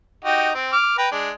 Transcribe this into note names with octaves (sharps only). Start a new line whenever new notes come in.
D#4 F#4 G4
C4
D6 F6
B4 G5 A#5
G#3 D4